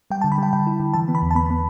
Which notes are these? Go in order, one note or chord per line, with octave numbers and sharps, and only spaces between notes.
G3 G5
A5
D3
B5
G3 G5
D3 G5
E4
D3
E3 A5
B3
B5
E2
A5
B3 B5
B3